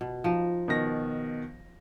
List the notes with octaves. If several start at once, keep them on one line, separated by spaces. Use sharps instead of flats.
B2
F3 D#4
B2 D#3 A#6